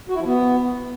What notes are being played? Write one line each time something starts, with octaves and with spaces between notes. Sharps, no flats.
F#4
E4
F3
B3